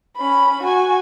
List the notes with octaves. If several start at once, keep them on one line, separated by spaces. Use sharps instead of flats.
C#4 B5
F#4 G#5